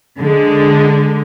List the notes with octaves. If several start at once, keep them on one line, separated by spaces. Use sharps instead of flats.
D3 G#3